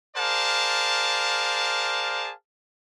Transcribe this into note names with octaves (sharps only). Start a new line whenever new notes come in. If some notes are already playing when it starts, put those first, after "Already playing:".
G#4 A#4 C5 D5 F5 A5